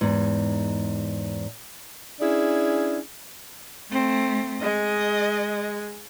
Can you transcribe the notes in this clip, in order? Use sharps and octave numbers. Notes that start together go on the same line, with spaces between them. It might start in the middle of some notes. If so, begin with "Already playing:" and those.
E2 G#2
C#4 D4 E4 G#4
A3 C4
G#3 D#5